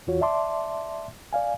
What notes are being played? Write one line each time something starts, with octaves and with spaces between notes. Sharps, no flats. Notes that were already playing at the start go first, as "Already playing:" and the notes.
E2 E3 F4 F#4 C#5
D5 E5 A5 C6 D6
D5 F5 G#5